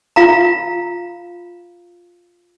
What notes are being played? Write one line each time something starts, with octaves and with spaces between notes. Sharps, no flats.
F4 F5 A#5